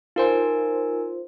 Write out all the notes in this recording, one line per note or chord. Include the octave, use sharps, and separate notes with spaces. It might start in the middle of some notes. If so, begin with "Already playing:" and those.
D#4 F4 A#4 C5 G#5